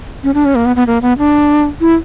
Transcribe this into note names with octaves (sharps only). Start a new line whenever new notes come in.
C#4
D4
C#4
A#3
B3
B3
A#3
B3
D4
E4